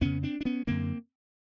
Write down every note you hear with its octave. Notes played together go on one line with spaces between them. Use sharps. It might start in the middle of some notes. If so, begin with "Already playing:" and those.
F2 C#3 B3 C#4
C4 D4
D4
B3 C#4
F#2 D3 A#3 C4